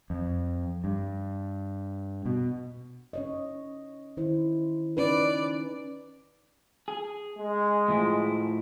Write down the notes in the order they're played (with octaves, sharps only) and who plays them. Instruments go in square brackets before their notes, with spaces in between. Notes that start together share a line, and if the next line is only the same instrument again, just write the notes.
[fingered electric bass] F2
G2
B2
[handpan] C#4 C#5 D#5
D#3 E4 C5
[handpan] C#4 D#4 B4 [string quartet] D5
[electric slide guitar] G#4
[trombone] G#3
[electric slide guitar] A2 F3 E4